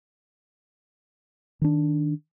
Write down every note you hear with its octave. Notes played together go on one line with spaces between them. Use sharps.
D#3 D4